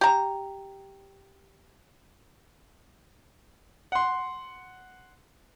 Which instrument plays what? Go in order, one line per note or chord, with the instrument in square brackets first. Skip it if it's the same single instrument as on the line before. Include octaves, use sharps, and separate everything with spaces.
[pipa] G4 A#5
[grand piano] F#5 C6